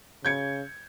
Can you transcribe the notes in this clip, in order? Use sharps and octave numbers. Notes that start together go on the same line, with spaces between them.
C#3 G6 G#6 C#7